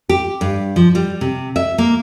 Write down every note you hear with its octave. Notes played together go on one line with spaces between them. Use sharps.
G4
G2
F3
G3
C3
E5
A#3